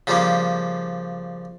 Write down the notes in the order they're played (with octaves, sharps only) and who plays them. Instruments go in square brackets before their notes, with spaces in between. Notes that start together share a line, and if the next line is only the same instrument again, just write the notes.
[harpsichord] C#3 F3 G3 A#3